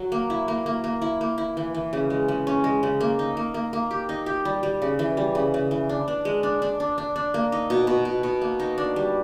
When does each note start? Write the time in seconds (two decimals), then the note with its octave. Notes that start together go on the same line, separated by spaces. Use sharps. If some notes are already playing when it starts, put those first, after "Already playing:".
Already playing: F#3
0.12 A#3
0.30 E4
0.48 A#3
0.66 A#3
0.84 A#3
1.02 E4
1.21 A#3
1.38 E4
1.57 E3
1.74 E3
1.93 C#3
2.10 G#3
2.28 C#3
2.47 C#4
2.64 G#3
2.83 C#3
3.00 A#3
3.19 D#4
3.37 A#3
3.54 A#3
3.73 A#3
3.91 G4
4.09 D#4
4.26 G4
4.45 G3
4.63 G3
4.82 C#3
4.99 E3
5.17 G3
5.35 C#3
5.54 C#3
5.71 E3
5.89 D4
6.08 D4
6.25 G#3
6.43 D4
6.62 D4
6.80 D4
6.98 D4
7.16 D4
7.34 A#3
7.52 D#4
7.70 B2
7.87 B2
8.05 B2
8.23 B2
8.42 A#3
8.60 D#4
8.78 D4
8.96 G3